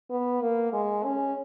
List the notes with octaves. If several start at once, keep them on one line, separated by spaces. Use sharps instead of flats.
B3
A#3
G#3
C#4